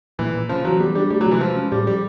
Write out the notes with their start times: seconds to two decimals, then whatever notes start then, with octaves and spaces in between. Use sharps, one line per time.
0.19 A#2 E3
0.33 A#2
0.49 C#3 F3
0.64 E3 F#3
0.80 G3 B3
0.95 G3 D4
1.10 G3 A3
1.21 F#3
1.27 C3 E3
1.41 F3 G#3
1.56 C#4
1.72 A2 G3
1.87 F3 G3